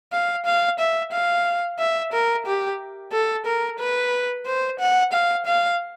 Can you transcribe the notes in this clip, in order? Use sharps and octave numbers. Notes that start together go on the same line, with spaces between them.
F5
F5
E5
F5
E5
A#4
G4
A4
A#4
B4
C5
F#5
F5
F5